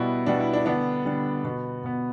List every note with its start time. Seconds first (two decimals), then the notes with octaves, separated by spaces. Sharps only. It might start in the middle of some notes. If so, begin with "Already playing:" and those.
Already playing: B2 G3 B3 E4
0.26 B2 G3 B3 D4
0.40 E4
0.53 D4
0.66 D3 G3 B3 D4
1.05 D3 G3 B3
1.44 B2 B3
1.84 B2 B3